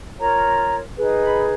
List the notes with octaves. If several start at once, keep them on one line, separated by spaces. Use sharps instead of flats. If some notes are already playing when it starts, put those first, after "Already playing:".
F4 A#4 C#5 A#5
D#4 G#4 B4
B5